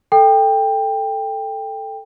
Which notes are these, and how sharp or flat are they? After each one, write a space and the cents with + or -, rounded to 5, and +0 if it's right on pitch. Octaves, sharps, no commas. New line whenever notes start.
A4 +0 G5 +15